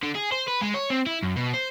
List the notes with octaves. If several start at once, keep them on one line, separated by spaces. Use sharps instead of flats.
D3
G#4
C5
B4
G#3
C#5
C4
E4
F#2
B2
C5